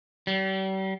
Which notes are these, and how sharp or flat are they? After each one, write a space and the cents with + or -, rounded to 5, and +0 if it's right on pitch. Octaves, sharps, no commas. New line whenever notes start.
G3 -40